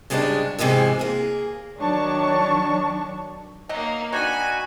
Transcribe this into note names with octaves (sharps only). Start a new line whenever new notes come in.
G#2 C#3 G3 G#3 C#4 D4
G#2 C3 E3 G#3 E4
A#3 G#4
D#3 F#3 D4 C#5 A5 C#6
F#3 A#3 D#4 F#4 D#5
D#3 D4 D#4 F#4 G#5 B5